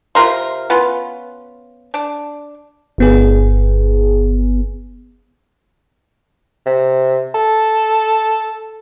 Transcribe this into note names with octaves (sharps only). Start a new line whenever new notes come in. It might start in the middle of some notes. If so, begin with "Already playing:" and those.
C3 F4 A#4 C6
B3 C#4 F4
D4
G1 B3 G#4
C3
A4